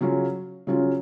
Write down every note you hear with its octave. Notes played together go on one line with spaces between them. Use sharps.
C#3 F#3 C#4 F4
C#3 F#3 C#4 F4